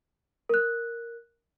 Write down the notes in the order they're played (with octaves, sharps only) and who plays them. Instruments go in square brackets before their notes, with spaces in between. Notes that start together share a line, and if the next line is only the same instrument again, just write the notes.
[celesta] A#4 F#6